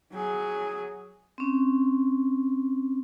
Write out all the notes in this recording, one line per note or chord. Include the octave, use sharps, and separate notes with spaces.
F#3 G#4
C4 C#4